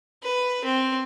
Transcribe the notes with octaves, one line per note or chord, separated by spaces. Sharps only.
B4
C4